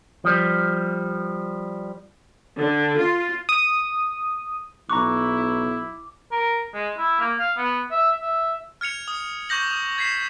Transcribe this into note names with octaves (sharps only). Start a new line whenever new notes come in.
F3 G3
D3
F4
D#6
B1 E4 A#5 C#6 D6 F#6
A#4
G#3
E4
A#3
F5
B3
E5
E5
F6 G#6 C#7 F7
D#6
C#6 D6 G6 A#6 F#7
D#6
G#6 B6 C7 E7